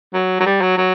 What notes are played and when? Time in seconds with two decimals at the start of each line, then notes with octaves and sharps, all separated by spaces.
0.14 F#3
0.39 F#3
0.46 G3
0.61 F#3
0.77 F#3